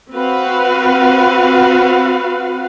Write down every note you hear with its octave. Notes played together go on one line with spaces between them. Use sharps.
C4 F#4 B4 F5 F#5